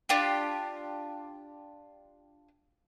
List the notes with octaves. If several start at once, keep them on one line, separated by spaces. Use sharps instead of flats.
D4 F4 G4